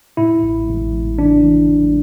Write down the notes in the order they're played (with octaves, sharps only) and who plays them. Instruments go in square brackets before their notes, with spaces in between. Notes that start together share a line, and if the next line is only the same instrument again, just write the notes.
[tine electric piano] A2 E4
A1
A1
A1
E3 D4
E3
A1